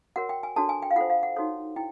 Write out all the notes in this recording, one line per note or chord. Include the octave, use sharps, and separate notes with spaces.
F#4 A#4 C#5 F#5
G5
G#5
D4 F#4 A4 C#5 A5
G#5
G5
F5
F4 A4 C5 F#5
F5
F#5
D#4 F#4 A4 C#5
E4 G5